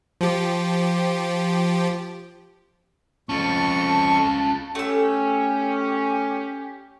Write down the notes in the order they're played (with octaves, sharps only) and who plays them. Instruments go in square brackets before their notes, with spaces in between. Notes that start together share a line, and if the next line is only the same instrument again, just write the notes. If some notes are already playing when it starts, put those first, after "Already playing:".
[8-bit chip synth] F3 G4
[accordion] F2 C#6 [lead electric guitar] C#4 F4 [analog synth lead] A5
[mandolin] A3 E6 [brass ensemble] C#4 [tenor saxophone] G4